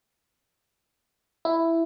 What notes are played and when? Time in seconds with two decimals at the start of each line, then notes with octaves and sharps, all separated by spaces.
1.45 E4